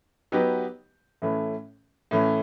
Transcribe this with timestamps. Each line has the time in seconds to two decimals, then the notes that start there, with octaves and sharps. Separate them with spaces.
0.32 F#3 B3 D#4 G4 B4
1.22 A2 E3 A3 C#4
2.11 A2 E3 A3 C#4